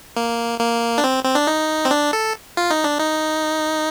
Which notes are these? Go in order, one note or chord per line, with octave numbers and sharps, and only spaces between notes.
A#3
A#3
D4
C4
C4
D4
D#4
C4
D4
A4
F4
D#4
D4
D#4